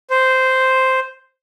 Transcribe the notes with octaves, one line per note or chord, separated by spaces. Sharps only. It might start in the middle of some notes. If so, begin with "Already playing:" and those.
C5